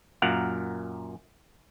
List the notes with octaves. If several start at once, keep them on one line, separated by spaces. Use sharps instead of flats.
F#2 A#2 A#4 F5 F#5